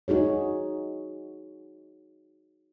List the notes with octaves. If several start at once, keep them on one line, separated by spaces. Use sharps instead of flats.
D#4 F#4 G#4 C#5